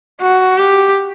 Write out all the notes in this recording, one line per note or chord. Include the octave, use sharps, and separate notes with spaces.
F#4
G4